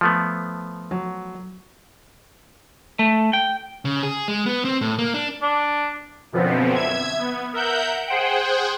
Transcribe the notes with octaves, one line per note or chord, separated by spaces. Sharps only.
F3 A3 B3
F#3
A3
G5
C#3
G#4
G#3
B3
C4
A2
A#3
D4
D4
F#2 B2 D3 F3 B3 C4
E5 G#6
B3
A#4 E5 F#5 G6
G#4 C5 F#5 G5